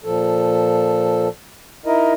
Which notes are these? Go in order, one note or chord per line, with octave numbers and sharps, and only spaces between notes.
A#2 F3 A4
D#4 E4 A#4 D#5